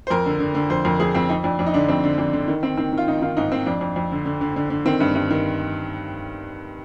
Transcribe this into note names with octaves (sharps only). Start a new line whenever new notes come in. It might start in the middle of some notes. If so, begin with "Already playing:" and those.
C5
F2 A#4
D3
D3
D3
F2 C5
F2 A#4
F2 G#4
F2 C4
F2 D#4
F2 D4
F2 D4
D#4
D3 D4
F2 C4
D3
F2 D4
D3
D#3
D#3 C4
D#3 C4
D#3 F4
D#3 D#4
D#3 F4
G#2 D#4
D#3 C4
F2 D4
F2
F2
D3
D3
D3
D3
D3
D#3 C4
G2
G2
D#3